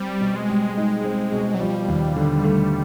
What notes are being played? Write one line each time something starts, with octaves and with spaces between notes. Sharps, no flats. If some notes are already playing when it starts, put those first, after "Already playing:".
Already playing: G3 C4
B2
G#3
G3
D#4
C4
B2
F#3
F3 G3
D#2
D3
A3